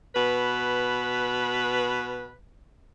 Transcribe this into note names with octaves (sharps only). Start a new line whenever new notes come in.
B2 B4